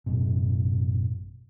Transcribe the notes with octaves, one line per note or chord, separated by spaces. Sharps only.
A1 F#2 B2